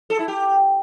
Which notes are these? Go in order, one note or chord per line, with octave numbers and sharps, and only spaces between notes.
A4
E4
G4